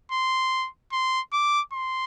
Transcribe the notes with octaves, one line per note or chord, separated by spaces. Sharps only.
C6
C6
D6
C6